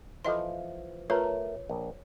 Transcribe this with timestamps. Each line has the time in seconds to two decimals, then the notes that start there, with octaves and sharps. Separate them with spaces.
0.25 E3 F3 A4 D#5 C6
1.10 A3 F4 A#4 B4 C#5
1.69 A#1